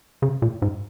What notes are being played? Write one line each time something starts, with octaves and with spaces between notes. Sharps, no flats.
C#3
A#2
G#2